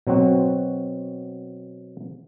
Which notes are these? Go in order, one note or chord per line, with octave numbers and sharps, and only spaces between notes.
B2 F#3 C4 F#4